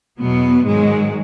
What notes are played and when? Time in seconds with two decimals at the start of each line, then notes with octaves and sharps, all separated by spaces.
0.17 E2 B2 F#3 B3
0.65 G#2 D#3 F#3 G#3